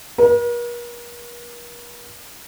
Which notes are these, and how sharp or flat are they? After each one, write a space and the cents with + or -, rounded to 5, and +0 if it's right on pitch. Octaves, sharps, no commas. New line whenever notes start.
A#4 +45